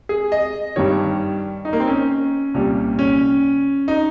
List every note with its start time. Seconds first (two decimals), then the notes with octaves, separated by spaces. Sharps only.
0.09 G#4
0.32 D#5
0.76 G2 D#3 G3 C#5
1.65 D#4
1.73 A#3
1.80 C4
1.88 C#4
2.54 C2 A#2 G3
2.99 C#4
3.88 D#4